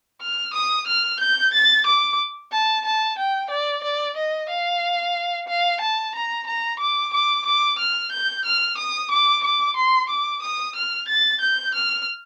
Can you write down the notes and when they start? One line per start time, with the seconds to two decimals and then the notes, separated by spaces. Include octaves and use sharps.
0.21 F6
0.54 D#6
0.87 F6
1.20 G6
1.54 A6
1.86 D6
2.52 A5
2.85 A5
3.18 G5
3.50 D5
3.84 D5
4.17 D#5
4.49 F5
5.48 F5
5.81 A5
6.15 A#5
6.47 A#5
6.80 D6
7.13 D6
7.46 D6
7.79 F6
8.12 G6
8.45 F6
8.78 D#6
9.11 D6
9.44 D6
9.76 C6
10.10 D6
10.42 D#6
10.76 F6
11.08 A6
11.41 G6
11.75 F6